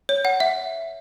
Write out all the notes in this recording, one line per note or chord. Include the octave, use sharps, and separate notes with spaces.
C#5
F#5
E5